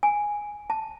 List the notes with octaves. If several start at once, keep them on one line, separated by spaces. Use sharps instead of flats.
G#5
A5